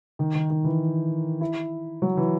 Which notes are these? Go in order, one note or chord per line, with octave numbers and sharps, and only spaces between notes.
D#3
D#3
D#3
E3
E4
F#3
E3